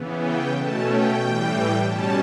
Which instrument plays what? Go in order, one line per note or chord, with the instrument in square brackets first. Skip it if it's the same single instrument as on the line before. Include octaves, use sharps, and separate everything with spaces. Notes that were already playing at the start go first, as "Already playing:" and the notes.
Already playing: [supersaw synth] C#3 E3 B3
G5
B2 A3 C#4 A5
G5
A2 E3 G3
B2 G3 C#4 A5